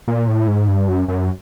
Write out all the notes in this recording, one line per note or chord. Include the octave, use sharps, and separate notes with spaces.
A#2
A2
G#2
G2
F#2
F#2